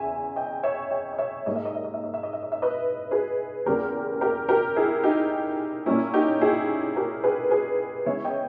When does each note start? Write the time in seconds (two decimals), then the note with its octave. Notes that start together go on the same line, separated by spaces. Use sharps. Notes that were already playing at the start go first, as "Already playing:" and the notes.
Already playing: E2 C#3 E5 G#5
0.36 D#5 G5
0.63 C#5 E5
0.90 D#5 G5
1.13 D#5
1.18 C#5 E5
1.46 G#2 G3 A#3 D#5
1.56 E5
1.65 D#5
1.75 E5
1.84 D#5
1.94 E5
2.04 D#5
2.14 E5
2.23 D#5
2.33 E5
2.43 D#5
2.52 E5
2.62 B4 D#5
3.11 G#4 B4
3.66 E2 C#3 G3 A#3 G4 A#4
4.21 G4 A#4
4.49 G4 A#4
4.76 E4 G#4
5.03 D#4 G4
5.86 A#2 G3 A#3 C#4 E4
6.14 D#4 G4
6.41 E4 G#4
6.96 G4 A#4
7.24 G#4 B4
7.51 G#4 B4
8.06 C#3 E3 G#3 B3 C#5 E5
8.24 D#5 G5